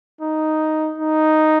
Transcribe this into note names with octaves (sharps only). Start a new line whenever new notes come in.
D#4
D#4